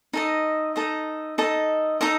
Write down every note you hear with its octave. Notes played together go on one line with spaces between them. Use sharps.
D#4 A4 D#5
D#4 A4 D#5
D#4 A4 D#5
D#4 A4 D#5